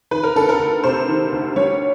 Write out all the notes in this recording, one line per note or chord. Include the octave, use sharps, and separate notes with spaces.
D#3 B4
A#4
D2 A4
A#4
D2
C3 C5
D#3
D2
G3 C#5